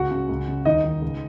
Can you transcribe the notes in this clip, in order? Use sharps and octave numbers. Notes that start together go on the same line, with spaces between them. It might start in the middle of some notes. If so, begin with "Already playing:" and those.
Already playing: C#2 F#4 F#5
C#3
C#2
C#3
D#2 D#4 D#5
D#3
C#2